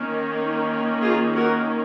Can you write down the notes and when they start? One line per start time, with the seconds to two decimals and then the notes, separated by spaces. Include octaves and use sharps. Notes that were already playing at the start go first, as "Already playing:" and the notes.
Already playing: D#3 A#3 C#4
1.01 F4 G#4
1.35 F#4 A#4